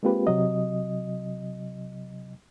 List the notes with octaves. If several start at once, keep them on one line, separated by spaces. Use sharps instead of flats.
G#3 A#3 C4 F4 G4 B4
C3 F#3 D#5